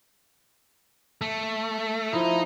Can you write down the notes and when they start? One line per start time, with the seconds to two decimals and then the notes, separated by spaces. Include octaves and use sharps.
1.21 A3
2.13 F3 D#4 E4